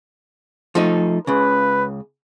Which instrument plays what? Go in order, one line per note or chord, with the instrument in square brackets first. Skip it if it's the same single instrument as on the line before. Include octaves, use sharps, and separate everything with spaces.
[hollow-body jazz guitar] F3 A3 D#4
[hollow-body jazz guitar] C#2 C#3 [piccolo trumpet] B4